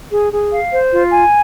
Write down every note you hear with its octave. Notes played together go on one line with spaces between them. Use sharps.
G#4
G#4
F5
C5
F4
G#5